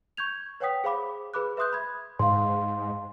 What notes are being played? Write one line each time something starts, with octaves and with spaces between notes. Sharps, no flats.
C#6 G6 G#6 F7
B4 C#5 F#5 G5 D#6 B6
G#4 C5 F5 B5 D6
G#4 B4 B5 D6 F#6
B4 E5 C6 D#6 F#6 G6
B5 G#6
G#2 F5 C6